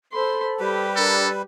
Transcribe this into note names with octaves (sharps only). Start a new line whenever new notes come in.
A4 C5 B5 C6
G3 G4 B4
D4 A4 A#4